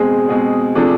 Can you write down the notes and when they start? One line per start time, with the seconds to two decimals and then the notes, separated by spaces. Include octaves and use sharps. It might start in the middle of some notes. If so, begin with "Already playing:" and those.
Already playing: B2 G#3 C4 G#4
0.29 B2 G#3 C4 G#4
0.75 C3 F3 A3 D4 G#4